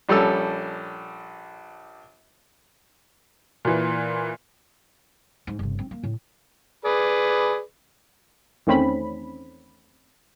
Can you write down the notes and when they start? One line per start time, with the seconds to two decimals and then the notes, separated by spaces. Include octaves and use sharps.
0.09 A#1 G3 C#4 A4 E6
3.65 A#2 E3
5.47 G#2
5.59 G1 C3
5.79 C4
5.91 A#3
6.03 A2
6.85 G#4 B4 D5
8.67 E2 D#3 A3 C4 C#4 B5